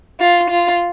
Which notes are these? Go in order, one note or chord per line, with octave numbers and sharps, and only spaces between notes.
F4
F4